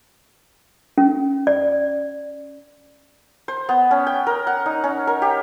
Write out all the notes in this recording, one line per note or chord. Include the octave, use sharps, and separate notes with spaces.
C#4
D5
C5
B3
C#4
G5
A#4
F#5
D#4
C#4
A#4
G4